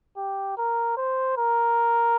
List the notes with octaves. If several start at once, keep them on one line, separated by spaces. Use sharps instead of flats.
G4
A#4
C5
A#4